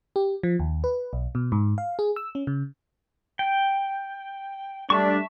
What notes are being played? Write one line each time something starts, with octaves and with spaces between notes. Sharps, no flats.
G4
F3
D#2
B4
B1
B2
G#2
F5
G#4
E6
C#4
C#3
G5
G3 A3 D4 E5 A5 C#6